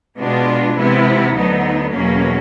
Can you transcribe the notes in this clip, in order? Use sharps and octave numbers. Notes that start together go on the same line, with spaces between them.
B2 G#3 B3 D4 F4
C3 E3 G#3 B3 E4
D2 D3 F#3 B3 D#4
E2 B2 F#3 A#3 C#4